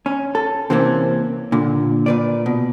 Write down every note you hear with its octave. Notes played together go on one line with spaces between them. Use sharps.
C#4
A4
C3 E3 A#3 C4 C#4
A#2 D3
A#2 B4 D5
B2